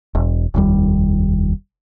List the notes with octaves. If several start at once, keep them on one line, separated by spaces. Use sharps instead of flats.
E1
F1 D#2 G3